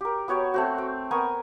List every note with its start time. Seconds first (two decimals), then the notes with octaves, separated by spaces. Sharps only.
0.01 G4 A#4
0.28 B3 F#4 C#5 G5
0.54 A3 C4 F#4
0.78 G5
1.11 B3 A#4 G#5 C#6